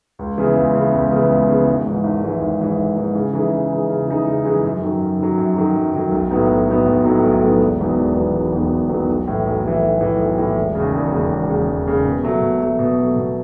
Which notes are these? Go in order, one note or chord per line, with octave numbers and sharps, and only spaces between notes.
C#2
C#3 E3 B3
C#2
C#3 E3 B3
C#2
C#3 E3 B3
C#2
C#3 E3 B3
G#1
G#2 E3
G#1
G#2 E3
G#1
G#2 E3
G#1
G#2 E3
C#3
E3 G#3 D#4
C#3
E3 G#3 D#4
C#3
E3 G#3 D#4
C#3
E3 G#3 D#4
F#2
D#3 F#3
F#2
D#3 F#3
F#2
D#3 F#3
F#2
D#3 F#3
B1
A2 F#3 B3 D#4
B1
A2 F#3 B3 D#4
B1
A2 F#3 B3 D#4
B1
A2 F#3 B3 D#4
E1
E2 D#3 F#3 B3
E1
E2 D#3 F#3 B3
E1
E2 D#3 F#3 B3
E1
E2 D#3 F#3 B3
B1
A2 E3
B1
A2 E3
B1
A2 E3
B1
A2 E3
E1
D#2 C#3
E1
D#2 C#3
E1
D#2 C#3
E1
D#2 C#3
B2
F#3 A3
B2
F#3 A3
B2
F#3 A3
B2